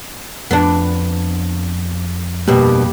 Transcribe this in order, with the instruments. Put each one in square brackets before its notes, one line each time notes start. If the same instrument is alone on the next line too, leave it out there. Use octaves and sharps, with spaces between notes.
[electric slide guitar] F2 [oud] B3 D4
[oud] G2 B2 [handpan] G3 A#3 G4